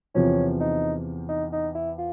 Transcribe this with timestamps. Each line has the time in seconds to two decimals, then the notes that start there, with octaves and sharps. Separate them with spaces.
0.15 E2 C3 F3 C#4
0.60 D#4
1.28 D#4
1.52 D#4
1.75 E4
1.98 F4